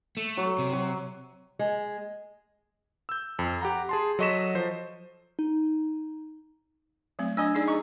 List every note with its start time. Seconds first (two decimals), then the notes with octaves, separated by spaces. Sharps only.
0.17 A3
0.37 F#3
0.59 C3
0.73 F#3
1.59 G#3
3.09 E6 G6
3.39 F2
3.61 G4 F#5 A#5
3.89 G#4 A5 C6
4.19 F#3 A4 D#5 C#6 B6 E7
4.55 F3 C5
5.39 D#4
7.19 F#3 A3 C4
7.37 D4 D#5 G#5 E6
7.55 D#4 G#4 D5
7.68 G#4 D#5 A#5 C#6